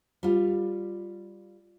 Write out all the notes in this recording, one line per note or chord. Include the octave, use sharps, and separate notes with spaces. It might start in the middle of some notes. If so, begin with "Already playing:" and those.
G3 F4